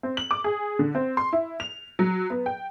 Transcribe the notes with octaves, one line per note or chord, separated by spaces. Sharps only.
C4
F#7
D6
G#4
D3
C4
C6
E4
F7
F#3
B3
G5